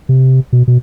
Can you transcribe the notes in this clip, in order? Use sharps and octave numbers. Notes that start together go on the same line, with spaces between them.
C3
B2
B2